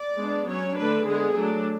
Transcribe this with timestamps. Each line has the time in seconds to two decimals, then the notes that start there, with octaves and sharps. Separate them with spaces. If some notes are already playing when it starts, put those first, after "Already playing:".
Already playing: D5
0.18 G#3 B3 D4
0.47 F#3 C#4 C#5
0.77 D3 A3 D4 B4
1.06 D3 G#3 B3 G#4
1.36 F#3 A3 D4